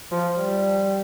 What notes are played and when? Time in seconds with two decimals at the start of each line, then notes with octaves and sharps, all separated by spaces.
0.12 F3
0.39 G3